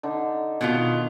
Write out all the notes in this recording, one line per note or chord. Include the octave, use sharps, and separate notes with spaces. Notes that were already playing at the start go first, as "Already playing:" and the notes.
D3 D#4
B2 D#3 F4